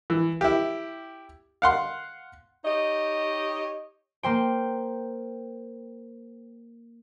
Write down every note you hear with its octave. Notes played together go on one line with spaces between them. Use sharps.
E3
E4 G4
F5 F#5 C6
D#4 G4 C#5 D#5
A#3 C5 G5